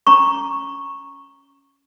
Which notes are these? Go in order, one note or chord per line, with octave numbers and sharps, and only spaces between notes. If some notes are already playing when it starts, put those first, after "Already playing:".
C#4 A#5 C#6